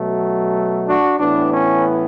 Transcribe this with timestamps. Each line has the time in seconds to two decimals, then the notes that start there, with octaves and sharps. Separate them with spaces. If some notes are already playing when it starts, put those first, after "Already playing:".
Already playing: B2 F#3 A3
0.87 D4 F#4
1.19 A2 E3 B3 D4
1.51 C#4